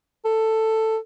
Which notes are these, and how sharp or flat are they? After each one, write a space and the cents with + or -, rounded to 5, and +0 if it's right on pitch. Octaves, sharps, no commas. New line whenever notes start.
A4 +10